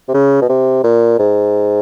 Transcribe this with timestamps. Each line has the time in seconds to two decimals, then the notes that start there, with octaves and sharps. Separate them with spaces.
0.08 C3
0.14 C#3
0.41 B2
0.49 C3
0.83 A#2
1.19 G#2